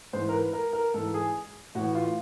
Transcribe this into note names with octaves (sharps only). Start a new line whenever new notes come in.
G#2 E3 C5
A#4
B4
A#4
A#4
G#2 E3 A4
G#4
A2 E3 F#4
F4